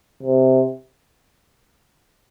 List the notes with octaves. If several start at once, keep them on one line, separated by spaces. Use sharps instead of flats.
C3